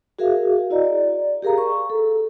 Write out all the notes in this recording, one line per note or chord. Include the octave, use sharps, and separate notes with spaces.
F#4 G#4 A#4 E5 F5
E4 F#4 D5 D#5 A#5
D5
G4 G#4 A#4 F5 A#5
C#6
A4